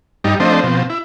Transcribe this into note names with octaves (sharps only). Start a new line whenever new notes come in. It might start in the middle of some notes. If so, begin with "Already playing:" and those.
G2 G3 D#4
F3 A3 C4 D4 C5 D#5
B2 F3 C4
E4